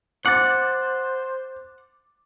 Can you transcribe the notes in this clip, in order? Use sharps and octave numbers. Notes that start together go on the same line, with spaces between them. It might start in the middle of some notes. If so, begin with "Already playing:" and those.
C5 F#5 D6 A6